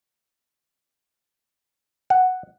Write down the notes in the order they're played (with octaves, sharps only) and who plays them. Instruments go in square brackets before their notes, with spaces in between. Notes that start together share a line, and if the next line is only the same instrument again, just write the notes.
[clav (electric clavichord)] F#5